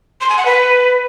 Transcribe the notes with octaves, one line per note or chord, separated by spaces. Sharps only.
C6
G#5
F#5
B4